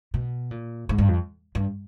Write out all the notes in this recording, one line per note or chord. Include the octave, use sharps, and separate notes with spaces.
B2
A#2
G#2
G2
F2
G2